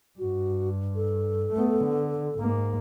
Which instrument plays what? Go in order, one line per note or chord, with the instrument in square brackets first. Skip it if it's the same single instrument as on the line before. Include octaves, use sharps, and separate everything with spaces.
[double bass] G2 [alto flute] F#4
[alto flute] A4
[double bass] A3 B3
D3
G#2 A#3